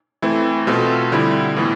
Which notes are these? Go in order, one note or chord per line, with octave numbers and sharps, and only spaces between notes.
E3 A3 C4 E4
B2 A3 C4 F4 A4
D3 G3 C4 E4
A2 E3 B3